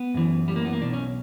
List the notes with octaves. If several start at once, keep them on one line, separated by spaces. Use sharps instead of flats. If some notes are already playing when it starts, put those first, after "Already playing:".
Already playing: B3
F#2 E3
G3
A#3
B3
A#3
B1 B2 D4
C#4